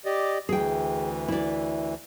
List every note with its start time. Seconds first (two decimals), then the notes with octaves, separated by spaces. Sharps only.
0.05 G4 D5 D#5
0.49 D2 E3 G#4 G5
1.28 E4 D5